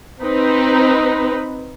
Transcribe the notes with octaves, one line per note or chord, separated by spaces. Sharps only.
C4 D#4 B4